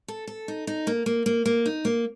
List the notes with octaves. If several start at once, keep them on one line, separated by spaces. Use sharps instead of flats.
A4
A4
D#4
D#4
A#3
A#3
A#3
A#3
D#4
A#3